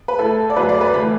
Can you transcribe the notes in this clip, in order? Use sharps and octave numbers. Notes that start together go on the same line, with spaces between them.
B4
A2 A3 A4
D5
F#2 F#3 A3 B4
D5
B4
A2 E3 A3 B5